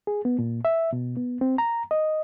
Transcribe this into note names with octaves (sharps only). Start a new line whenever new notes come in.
G#4
B3
A#2
E5
B2
B3
C4
A#5
D#5